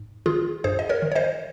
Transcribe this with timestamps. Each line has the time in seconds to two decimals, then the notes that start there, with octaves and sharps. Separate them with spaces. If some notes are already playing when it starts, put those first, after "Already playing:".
Already playing: G#2
0.26 D#3 F4 G#4
0.64 G2 G#4 C5
0.79 D#5
0.89 A#4 C#5
1.02 D#3
1.12 C#5
1.15 C5 D#5